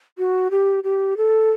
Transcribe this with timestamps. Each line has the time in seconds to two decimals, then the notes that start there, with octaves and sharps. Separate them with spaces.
0.18 F#4
0.51 G4
0.84 G4
1.17 A4